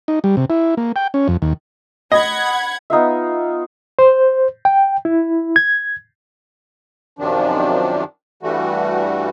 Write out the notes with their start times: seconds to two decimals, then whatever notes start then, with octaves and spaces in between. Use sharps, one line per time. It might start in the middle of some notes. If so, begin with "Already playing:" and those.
0.08 D#4
0.24 G3
0.37 C3
0.50 E4
0.77 A#3
0.96 G5
1.14 C#4
1.28 F2
1.42 D#2
2.12 D#5 F#5 B5 G#6
2.90 B3 D#4 F4 E5
3.99 C5
4.65 G5
5.05 E4
5.56 G#6
7.19 F#2 C3 D#3 F3 D4
8.43 G2 E3 G3 A3 F#4